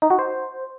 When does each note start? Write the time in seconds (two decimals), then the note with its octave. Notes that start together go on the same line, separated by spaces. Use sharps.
0.02 D#4
0.10 F#4
0.19 C5